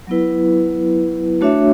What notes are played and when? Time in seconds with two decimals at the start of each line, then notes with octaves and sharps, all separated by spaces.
0.07 F#3 B3 E4 B4
1.41 A3 D4 F#4 C#5 E5